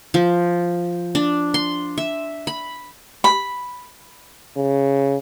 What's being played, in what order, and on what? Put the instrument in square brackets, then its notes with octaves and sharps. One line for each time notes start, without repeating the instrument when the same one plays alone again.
[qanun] F3
D4
C6
E5
B5
[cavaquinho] B5
[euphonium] C#3